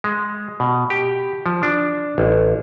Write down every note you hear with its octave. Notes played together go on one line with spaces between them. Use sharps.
G#3
B2
G4
F3
D4
A1